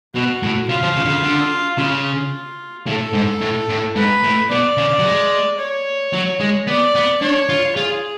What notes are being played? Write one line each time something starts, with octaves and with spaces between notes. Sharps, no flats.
B2 F#4
A2
C#3 F4
F3
C#3
D3
C#3
D3
C#3 F4
A2 A4
G#2
A2
A2
G#2 B4
A2
B2 D5
C#3
F#3
G#3
C#5
F#3
G#3
B3 D5
B3
D4 C#5
F4
F4 G#4